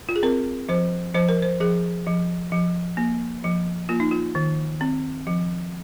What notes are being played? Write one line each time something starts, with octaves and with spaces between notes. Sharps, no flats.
F4
G#4
C4 A#4
F3 C5
F3 C5
A#4
C5
F3 G#4
F3
F3
A#3
F3
A#3 F4
D#4
F4
D#3
C4
F3